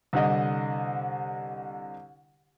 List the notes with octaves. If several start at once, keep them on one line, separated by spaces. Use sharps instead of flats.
C2 D3 D#5